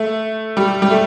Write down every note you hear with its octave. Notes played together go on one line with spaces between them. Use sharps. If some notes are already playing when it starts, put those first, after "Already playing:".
Already playing: A3
G3
G3
A3